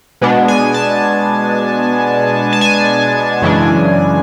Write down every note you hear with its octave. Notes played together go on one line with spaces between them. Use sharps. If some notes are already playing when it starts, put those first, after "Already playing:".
B2 G#3 B3 D4
G#5
A5
A5
G#5
F#2 C#3 E3 G#3 D4